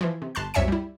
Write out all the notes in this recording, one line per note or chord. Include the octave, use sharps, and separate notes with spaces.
E3 F3
C3
G1 A5 C6 F#6
C2 F#2 C#5 E5 G#5 C#7
G3 E4